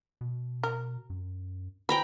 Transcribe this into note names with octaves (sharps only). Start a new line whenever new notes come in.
B2
A#4
F#2
E3 G5 A#5 B5